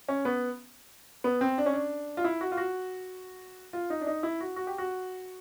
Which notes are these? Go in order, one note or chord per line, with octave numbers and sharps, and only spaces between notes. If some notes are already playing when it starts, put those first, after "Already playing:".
C#4
B3
B3
C4
D4
C#4
D4
F4
E4
F#4
F4
F#4
F4
D#4
D4
D#4
E4
F#4
F#4
G4
F#4